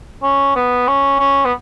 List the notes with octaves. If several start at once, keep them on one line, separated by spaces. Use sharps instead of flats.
C#4
B3
C#4
C#4
B3